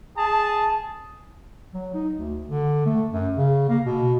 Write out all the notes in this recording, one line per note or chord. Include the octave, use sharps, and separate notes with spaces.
G#4 A5
F#3
D#4
D2
D3
A3
F#2
C#3
A#3
B2